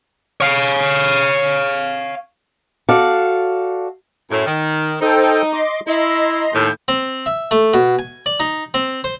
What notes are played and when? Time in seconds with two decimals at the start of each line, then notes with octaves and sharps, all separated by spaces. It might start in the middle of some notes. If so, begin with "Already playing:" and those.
0.41 C#5 F5
2.89 F#4 A4 D5 F5
4.31 F#2 A2
4.47 D#3
5.02 D#4 A4 C5 G5
5.53 D#5 C6 D6
5.87 E4 D#5 A#5 C6
6.54 D#2 A2 G6
6.88 C4
7.26 E5
7.51 A3
7.74 B2
7.99 G#5
8.26 D5
8.40 D#4
8.74 C4
9.04 C5